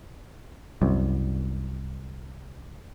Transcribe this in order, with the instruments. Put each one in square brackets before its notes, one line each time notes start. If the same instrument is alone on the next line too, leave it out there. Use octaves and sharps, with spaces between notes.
[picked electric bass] C2 F#2